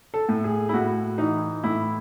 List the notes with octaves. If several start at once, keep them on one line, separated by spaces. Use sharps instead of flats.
A4
A2
G#4
E4
A2 F#4
E3 D#4
A2 E4